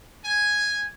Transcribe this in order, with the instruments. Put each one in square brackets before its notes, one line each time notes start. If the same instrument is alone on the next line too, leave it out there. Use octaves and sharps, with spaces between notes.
[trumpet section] G#5